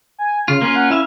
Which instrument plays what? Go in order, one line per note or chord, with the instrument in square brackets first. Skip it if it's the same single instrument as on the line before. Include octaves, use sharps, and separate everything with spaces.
[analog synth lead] G#5
[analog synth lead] C#3 [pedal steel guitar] F4
[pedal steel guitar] A#3 C#4 F4 [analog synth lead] C6
[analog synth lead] F#5
[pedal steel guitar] C#4 E5 F5 [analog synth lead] E4